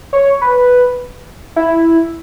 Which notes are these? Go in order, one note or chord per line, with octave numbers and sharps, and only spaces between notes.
C#5
B4
E4